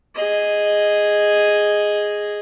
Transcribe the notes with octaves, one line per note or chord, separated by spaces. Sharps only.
G#4 D#5